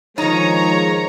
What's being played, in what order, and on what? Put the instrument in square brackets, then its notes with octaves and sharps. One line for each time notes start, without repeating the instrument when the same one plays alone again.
[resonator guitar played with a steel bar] D#3 D#4 [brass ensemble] F3 G#3 [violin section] C#5 A#5